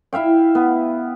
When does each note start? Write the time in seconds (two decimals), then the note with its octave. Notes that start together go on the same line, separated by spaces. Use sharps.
0.13 E4 E5 F5 G5
0.55 B3